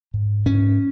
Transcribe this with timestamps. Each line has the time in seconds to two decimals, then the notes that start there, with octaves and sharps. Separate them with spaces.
0.14 G#2
0.46 G#2 C#4